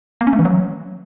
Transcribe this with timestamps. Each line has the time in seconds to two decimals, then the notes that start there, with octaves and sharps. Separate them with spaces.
0.21 A#3
0.27 C#4
0.33 A3
0.39 E3
0.45 F#3